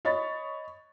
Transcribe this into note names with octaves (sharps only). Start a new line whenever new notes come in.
C#5 D#5 B5 C#6 A6